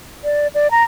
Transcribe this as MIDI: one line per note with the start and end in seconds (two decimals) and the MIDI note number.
0.24 0.47 74
0.55 0.71 74
0.71 0.83 82